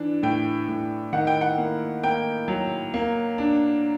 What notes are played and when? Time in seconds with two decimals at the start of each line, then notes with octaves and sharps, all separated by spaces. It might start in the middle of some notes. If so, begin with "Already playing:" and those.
Already playing: E3 D4
0.23 A2 G5
0.68 A2
1.13 D#3 F#5
1.27 G5
1.41 F#5
1.58 A#3
2.03 A#3 G5
2.48 F#3
2.94 A#3
3.38 D4